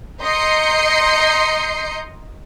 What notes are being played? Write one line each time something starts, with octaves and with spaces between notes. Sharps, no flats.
D#5 A#5 C6 G6 C7 C#7